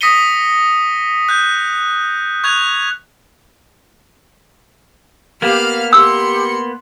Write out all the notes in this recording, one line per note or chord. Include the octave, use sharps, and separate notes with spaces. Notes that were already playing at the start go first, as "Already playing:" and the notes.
D#6 A#6 B6 C#7 D#7 G7
F#6 G6
C#6 F#6 G#6 F7
A#3 B3 G4 F5 F6
G4 C6 E6 C#7